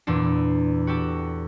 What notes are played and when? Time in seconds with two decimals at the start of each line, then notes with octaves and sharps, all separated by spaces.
0.07 E2 A#2 E3 D4
0.87 F#4 G4 A4